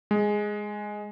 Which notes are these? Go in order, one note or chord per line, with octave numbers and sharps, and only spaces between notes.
G#3